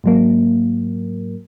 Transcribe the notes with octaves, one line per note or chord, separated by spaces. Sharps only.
G#2 F#3 A#3